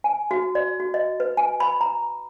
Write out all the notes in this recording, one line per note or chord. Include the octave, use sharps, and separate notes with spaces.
G#5
F#4
D5
F#4
D#5
B4
G#5
B5
A#5